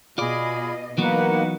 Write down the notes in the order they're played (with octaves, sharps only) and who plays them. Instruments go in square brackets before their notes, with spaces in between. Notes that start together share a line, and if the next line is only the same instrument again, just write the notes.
[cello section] B2 D#5 [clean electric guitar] F4 D5 [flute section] G#4 B5
[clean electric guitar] E3 F#3 B3 [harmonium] A#3 [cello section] D#4 [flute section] B4 F#5